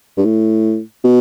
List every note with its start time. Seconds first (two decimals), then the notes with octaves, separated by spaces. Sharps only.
0.17 G2
0.25 A2
1.04 B2